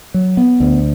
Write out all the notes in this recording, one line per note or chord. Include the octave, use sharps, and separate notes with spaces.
F#3
B3
D2